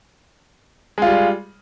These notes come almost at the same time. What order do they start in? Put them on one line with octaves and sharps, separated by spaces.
G#3 F4 G3